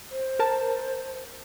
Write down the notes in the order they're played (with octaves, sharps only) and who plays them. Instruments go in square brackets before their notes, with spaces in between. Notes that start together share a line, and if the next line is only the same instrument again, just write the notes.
[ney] C5
[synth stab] A#4 A5